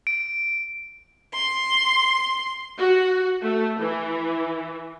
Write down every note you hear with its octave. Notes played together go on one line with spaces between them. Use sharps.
D7
C6
F#4
A3
E3